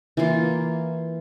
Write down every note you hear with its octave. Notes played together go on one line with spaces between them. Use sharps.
E3 A#3 F4